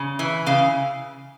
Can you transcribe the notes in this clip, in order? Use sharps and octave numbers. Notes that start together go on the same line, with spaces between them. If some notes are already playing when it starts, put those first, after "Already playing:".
Already playing: C#3
E3
C#3 F5